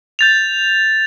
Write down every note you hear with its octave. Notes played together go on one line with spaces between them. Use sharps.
G6 A6 F7